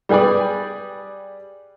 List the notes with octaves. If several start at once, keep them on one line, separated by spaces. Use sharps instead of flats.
G3 G4 G#4 B4 D5